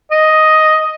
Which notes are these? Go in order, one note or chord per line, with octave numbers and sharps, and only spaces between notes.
D#5